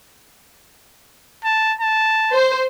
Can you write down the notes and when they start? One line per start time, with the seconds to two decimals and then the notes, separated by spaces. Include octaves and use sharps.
1.44 A5
1.81 A5
2.33 C5